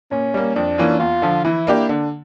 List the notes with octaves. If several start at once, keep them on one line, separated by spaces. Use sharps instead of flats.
A#2 C#4
G3 A#3
F2 D4
E3 A#3 C#4 F4
E2 F4
D3 F3
E3 E4
A#3 D4 G4
D3 D4